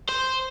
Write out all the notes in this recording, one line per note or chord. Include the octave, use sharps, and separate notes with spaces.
C5